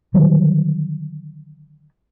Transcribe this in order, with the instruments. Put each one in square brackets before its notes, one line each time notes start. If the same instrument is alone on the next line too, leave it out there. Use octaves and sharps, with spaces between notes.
[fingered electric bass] D3 D#3 F#3 G3